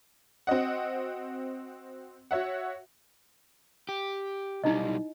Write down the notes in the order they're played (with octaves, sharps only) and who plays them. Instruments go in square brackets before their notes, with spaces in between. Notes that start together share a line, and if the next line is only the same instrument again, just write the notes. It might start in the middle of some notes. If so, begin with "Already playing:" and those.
[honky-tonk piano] C4 F#4 D#5 F#5
F#4 C#5 E5 F#5
[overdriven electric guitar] G4
[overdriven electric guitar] B1 G3 [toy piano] D#4 E4 D#5